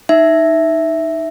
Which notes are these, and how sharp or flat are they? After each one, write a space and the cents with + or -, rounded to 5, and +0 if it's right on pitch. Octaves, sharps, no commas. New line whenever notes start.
D#4 +0 E5 +0